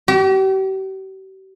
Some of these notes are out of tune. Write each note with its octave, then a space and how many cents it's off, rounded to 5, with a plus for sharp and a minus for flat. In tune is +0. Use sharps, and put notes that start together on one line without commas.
G4 -40